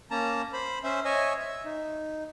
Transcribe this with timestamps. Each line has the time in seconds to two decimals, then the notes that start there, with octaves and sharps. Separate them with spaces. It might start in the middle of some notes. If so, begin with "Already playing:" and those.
0.11 A#3 C#4 A5 A#5
0.53 C5 B5
0.84 C#4 C5 E5
1.05 C#5 D#5 E5 G#5
1.40 E5
1.65 D#4